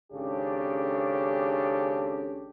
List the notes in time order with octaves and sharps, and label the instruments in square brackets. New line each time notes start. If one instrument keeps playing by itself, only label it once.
[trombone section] G#1 C#3 C#4 D4 G4 A4